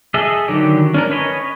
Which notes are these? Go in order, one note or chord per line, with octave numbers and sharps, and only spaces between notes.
G#4 A4 D#5 E5
D3 D#3 F#3 G4
C#4 D4 A#4
C#4 B4 C#5 D#5